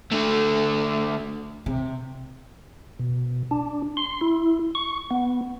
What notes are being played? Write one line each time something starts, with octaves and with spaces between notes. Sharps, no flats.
D3 A3
C3
B2
D4
C6
E4
C#6
B3